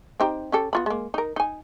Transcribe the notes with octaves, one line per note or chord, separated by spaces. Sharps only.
C4 D#4 G4
C#4 G4 A4
B3 F4 B5
G#3 A#3
D#4 A#4
D#4 G#5